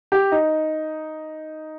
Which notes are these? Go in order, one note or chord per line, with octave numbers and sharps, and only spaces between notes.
G4
D#4